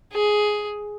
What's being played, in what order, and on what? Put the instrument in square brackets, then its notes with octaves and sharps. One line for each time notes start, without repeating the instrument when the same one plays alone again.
[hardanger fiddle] G#4